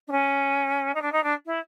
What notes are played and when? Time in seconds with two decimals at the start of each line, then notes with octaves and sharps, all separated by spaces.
0.07 D4
0.11 C#4
0.95 D#4
1.02 D4
1.12 D#4
1.23 D4
1.46 E4